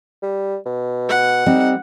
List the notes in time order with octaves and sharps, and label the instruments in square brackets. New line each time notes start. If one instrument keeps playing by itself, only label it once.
[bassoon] G3
B2
[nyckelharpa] F#5
[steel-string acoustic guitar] G3 C4 [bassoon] D#4